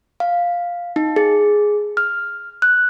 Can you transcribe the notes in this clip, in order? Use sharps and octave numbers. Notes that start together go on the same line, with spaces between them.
F5
D#4
G#4
F6
F#6